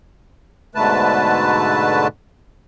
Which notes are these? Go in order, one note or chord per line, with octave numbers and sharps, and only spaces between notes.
G#2 B2 D3 A3 B4 A5